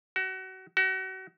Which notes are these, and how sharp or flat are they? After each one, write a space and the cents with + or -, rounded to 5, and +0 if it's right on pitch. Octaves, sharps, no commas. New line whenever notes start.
F#4 +30
F#4 +35